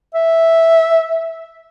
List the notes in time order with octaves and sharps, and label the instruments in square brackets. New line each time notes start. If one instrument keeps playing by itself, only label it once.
[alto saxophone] E5